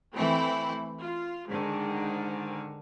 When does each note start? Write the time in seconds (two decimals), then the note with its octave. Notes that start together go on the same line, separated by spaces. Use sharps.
0.14 E3 A3 C4 E4
1.02 F4
1.49 G#2 D3 D#3